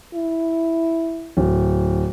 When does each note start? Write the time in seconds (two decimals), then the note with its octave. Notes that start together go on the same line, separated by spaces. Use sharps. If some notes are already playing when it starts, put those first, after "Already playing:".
0.15 E4
1.37 D1